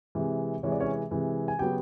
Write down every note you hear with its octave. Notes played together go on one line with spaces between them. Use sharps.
C3 E3 G#3
C3 E3 G#3 C#5
D5
C#4 C#5
C3 E3 G#3
G#5
C#3 F#3 B3 G4 G5